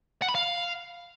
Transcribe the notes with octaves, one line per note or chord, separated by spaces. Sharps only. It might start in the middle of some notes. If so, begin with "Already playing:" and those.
F#5
B5
F5